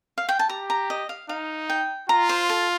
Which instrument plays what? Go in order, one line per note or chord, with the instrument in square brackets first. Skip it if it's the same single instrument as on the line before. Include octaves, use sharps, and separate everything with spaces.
[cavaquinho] F5
G5
A5
[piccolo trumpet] G4 [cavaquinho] A#5
[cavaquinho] A#5
D#5
F5
[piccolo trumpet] D#4 [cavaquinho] F5
[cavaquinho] G5
[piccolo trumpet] F4 [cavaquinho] A#5
[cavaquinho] C5
A4